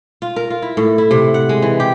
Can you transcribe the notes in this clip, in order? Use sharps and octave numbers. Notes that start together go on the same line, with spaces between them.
F4
A#4
F4
E4
A2
E4
C3
F#5
G#3
E3
G4